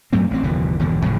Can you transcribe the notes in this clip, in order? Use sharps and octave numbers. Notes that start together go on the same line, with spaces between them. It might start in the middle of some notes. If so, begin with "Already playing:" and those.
G2 F#3 A3 C4
A1 C4
F#1 D#2 B2 E3
G1 E2 B2 D3
F2 A2 C#3 F3